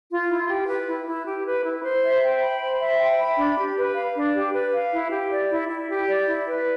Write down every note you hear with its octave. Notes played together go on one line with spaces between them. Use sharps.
F4
E4
G4
B4
E4
E4
G4
B4
E4
C5
E5
G5
B5
C5
E5
G5
B5
D4
G4
B4
F5
D4
G4
B4
F5
E4
G4
D5
E4
E4
G4
D5
E4
B4